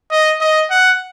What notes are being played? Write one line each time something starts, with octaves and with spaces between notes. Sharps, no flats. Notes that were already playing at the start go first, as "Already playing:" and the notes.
D#5
D#5
F#5